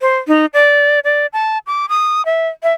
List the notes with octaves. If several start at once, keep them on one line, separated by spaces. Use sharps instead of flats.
C5
D#4
D5
D5
A5
D6
D#6
E5
E5